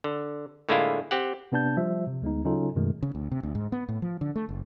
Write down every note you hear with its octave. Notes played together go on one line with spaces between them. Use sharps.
D3
A2 D3 G#3 A#3 E4 F4
C4 G4 F#5
C3 B3 D4 A5 G6
F3 G3 E5
C3
D2 G#3 B3 D#4
C#3 F#3 C#4 D#4 F4 A4
F#2 B2 D#3 G#3 A3
C#3
D2
C3
D2
G#2
B3
A2
F3
D3
A3
F#1